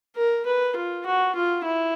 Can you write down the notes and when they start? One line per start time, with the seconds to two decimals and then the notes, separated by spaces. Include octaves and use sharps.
0.16 A#4
0.45 B4
0.75 F4
1.05 F#4
1.35 F4
1.64 E4